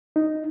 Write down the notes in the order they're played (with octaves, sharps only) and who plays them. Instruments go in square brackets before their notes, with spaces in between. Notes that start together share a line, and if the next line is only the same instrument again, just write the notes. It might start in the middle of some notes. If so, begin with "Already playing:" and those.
[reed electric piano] D#4